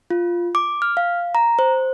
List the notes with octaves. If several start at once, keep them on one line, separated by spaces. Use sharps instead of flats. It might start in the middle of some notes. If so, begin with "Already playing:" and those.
F4
D6
F6
F5
A#5
C5